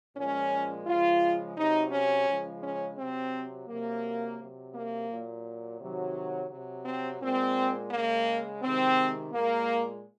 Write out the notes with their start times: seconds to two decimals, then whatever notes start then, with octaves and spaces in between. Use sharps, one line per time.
0.17 A#2 F3 G#3 C#4
0.87 C#3 F3 G#3 F4
1.57 C3 F#3 D#4
1.92 C#4
2.28 C#3 F3 G#3
2.63 C#4
2.98 C3 F#3 C4
3.68 C3 F#3 A#3
4.39 C3 F#3
4.74 A#3
5.09 A#2 F#3
5.80 C3 D#3 F#3
6.50 C3 F#3
6.86 C4
7.21 A#2 G#3 C4
7.91 C#3 G#3 A#3
8.62 C3 D#3 G#3 C4
9.33 A#2 G#3 A#3